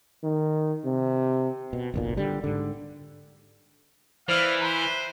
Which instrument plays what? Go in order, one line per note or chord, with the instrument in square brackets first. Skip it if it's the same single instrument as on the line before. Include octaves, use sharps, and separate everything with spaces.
[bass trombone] D#3
C3
[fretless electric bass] B2
F#1 B1 A#2
D3 G3
G#2 D3
[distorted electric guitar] E3 [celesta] C5 F6 [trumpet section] D5 E5 F5
[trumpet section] B4 C5 [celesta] A#5